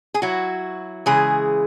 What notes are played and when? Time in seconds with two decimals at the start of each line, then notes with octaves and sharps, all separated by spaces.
0.14 G#4
0.22 F#3 E4 F#4
1.06 C#3 E3 G#3 G#4